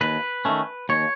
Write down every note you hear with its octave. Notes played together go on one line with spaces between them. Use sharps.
D#2 B4
D#3 A3 C#4
D#2 C#5